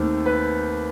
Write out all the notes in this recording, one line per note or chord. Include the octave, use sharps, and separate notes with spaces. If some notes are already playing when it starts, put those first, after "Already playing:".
Already playing: D#2 D#3 A3 C4
B4